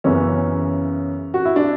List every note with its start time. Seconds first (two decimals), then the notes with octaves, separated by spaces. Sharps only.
0.04 F#2 C#3 E3 B3 C#4
1.34 F#4
1.45 E4
1.56 D4